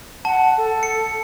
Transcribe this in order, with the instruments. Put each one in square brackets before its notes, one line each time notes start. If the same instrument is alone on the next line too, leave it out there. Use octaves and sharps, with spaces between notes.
[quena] F#5 [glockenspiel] A5
[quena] A4
[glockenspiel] C#7